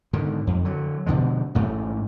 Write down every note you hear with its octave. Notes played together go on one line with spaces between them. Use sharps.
G#2 D3 D#3
F2
D3 F#3
B2 D3 F3 G#3
A1 G#2 A3